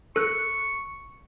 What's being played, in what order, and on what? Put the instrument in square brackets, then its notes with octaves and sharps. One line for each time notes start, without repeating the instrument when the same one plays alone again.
[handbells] A4 F#6 [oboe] C#6